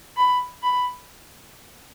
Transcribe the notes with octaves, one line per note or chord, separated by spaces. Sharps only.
B5
B5